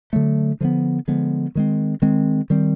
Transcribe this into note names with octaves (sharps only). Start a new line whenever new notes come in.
D3 F#3 A3
D3 F3 G#3 B3
D3 F3 G#3 B3
D#3 G#3 C4
D#3 G#3 C4
D#3 G3 C4